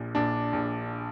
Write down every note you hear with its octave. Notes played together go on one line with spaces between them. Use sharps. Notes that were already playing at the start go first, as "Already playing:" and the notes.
Already playing: A#1 A#2
A#1 D4
A#1